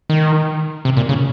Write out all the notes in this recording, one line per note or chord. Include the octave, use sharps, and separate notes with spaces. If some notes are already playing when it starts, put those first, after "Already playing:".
D#3
C3
A#2
C#3